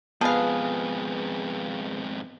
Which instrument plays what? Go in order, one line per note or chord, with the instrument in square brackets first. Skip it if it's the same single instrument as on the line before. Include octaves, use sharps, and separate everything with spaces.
[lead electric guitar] F2 G#2 [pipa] F3 F5 [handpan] B3 [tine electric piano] G#4 B4